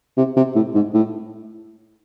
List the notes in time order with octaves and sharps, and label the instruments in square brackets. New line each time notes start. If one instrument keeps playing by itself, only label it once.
[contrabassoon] C3
C3
A2
G#2
A2